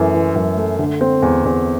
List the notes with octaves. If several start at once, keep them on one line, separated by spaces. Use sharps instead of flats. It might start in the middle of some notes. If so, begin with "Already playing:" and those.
Already playing: F#2 E3 A3
E3
F#2
A3
D3
C4
E2
E2